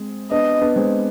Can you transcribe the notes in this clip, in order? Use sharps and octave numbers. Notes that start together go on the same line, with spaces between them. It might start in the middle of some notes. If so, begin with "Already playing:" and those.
Already playing: G#3 C4
B3 D4 D#5
B3 D4
G#3 C4